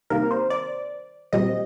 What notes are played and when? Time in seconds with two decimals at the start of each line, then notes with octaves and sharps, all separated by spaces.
0.10 C3 D#3 G3 A#3 A#4
0.31 C5
0.50 D5
1.33 A#2 G3 C4 D#5